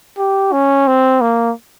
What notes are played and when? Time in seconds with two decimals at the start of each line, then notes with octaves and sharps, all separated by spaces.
0.18 G4
0.52 C#4
0.87 C4
1.21 A#3